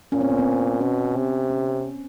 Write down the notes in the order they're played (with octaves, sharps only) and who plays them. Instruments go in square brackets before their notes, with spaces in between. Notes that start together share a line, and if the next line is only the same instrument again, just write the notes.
[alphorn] A#2 [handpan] C#4
[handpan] C4
B3
C4
[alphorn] B2 [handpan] C#4
[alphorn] C3
[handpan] C#4